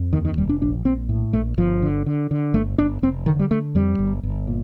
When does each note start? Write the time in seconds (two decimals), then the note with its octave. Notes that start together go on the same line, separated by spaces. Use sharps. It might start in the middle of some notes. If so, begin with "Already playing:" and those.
Already playing: F2
0.13 D#2 D#3
0.25 D#3
0.38 F1 G3
0.49 D4
0.62 A#1 D4
0.85 A#1 C4
1.09 A2
1.33 A#1 A3
1.58 G1 F3
1.82 D3
2.06 D3
2.31 D3
2.54 G1 A3
2.78 G1 D4
3.02 F1 C4
3.26 D3 D#3
3.39 G3
3.51 D3 A3
3.75 F2 G3
3.99 G1
4.23 G1
4.47 A#2